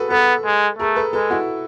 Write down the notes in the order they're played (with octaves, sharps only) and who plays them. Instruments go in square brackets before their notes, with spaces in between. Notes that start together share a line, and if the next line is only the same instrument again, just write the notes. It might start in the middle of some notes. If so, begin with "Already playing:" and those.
Already playing: [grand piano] F#4 G#4 A4 B4
[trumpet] B3 [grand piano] A4 B4
[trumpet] G#3
[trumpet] A3 [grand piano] G#4 A#4
[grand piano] A4 B4
[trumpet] G#3 [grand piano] A4 B4
[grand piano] E4 F#4